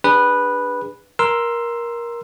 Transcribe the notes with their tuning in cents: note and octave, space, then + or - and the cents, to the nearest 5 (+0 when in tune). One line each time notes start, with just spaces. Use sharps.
D4 -5 G#4 -40 B4 -5
A#4 +15 C6 +0 E6 +15